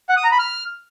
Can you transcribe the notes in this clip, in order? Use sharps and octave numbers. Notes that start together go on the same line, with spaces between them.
F#5
D#6
A#5
B5
F6